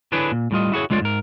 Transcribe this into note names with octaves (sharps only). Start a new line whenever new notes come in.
D3 D4 E4 G#4 B4 C#5
A#2
A2 G3 F4 D#5
E4 F#4 G#4 C#5
D3 G#3 F4 C#5 D5
G#2 A#4